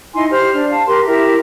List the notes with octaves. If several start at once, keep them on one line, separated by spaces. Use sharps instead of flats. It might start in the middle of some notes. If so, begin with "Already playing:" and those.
D#4 E4 G#5 C6
G4 C5 F6
D4 F6
F5 A5
G4 A#4 C6 F#6
E4 G4 A#4 E5